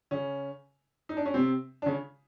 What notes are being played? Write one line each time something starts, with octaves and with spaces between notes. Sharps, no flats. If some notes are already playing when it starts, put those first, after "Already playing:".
C#3 C#4
D#4
D4
C#4
C3 C4
D4
C#3 C#4